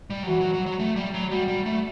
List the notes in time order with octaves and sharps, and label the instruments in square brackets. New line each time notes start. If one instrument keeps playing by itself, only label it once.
[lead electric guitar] G3
F#3
[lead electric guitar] E3 [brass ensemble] F#4
[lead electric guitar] F#3
F#3
F#3
A3
G3
F#3
[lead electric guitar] G3 [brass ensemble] F#4
[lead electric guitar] G3
A3